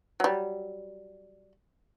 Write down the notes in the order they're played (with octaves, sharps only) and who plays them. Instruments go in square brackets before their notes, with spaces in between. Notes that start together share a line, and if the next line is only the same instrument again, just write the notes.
[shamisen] F#3 G3